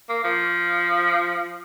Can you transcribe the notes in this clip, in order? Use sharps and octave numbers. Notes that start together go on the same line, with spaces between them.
A#3
F3